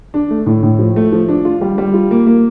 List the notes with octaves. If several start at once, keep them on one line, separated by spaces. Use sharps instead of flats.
D4
A3
A2
A2
F3
A3
F3
D4
F4
G3
G3
F4
A#3
A#3